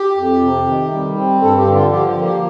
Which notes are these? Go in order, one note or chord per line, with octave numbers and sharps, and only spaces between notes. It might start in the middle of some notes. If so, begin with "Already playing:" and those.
Already playing: G4
F2
C3
D#3
G3
C4
G2 A4
G4
D3
F4
F3 G4
G4
A#3
G4